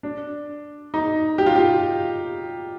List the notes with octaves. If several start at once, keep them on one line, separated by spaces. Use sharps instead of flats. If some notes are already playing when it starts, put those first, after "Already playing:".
D4
D#4
G4
F4
G4